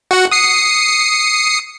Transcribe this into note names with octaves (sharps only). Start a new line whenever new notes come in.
F#4 F#5
D#6 C7 C#7